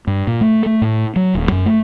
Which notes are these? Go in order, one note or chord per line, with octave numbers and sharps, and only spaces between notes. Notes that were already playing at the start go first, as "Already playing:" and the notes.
G2
A#2
A3
A3
A2
F#3
D#1
F#2
A3